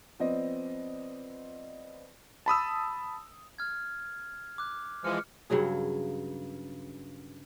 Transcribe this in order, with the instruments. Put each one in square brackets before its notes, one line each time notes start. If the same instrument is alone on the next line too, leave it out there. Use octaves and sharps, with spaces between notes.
[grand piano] F3 B3 C4 D5 D#5
[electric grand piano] A5 B5 D#6 E6
[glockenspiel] F6 G#6
D6 F#6
[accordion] E3 F3 G#3 [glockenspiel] F6 C#7
[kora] G2 C#3 F#3 G#4